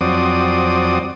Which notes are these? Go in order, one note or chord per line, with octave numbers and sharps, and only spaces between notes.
F2 F#3 C4 D5 D#6